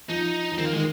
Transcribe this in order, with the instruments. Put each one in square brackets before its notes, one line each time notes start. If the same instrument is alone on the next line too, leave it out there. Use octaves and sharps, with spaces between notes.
[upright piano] F3 [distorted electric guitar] D#4
[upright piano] F3
[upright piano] D#3 [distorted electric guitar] C4
[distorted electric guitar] A#3
[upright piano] D#3 [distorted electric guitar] G#3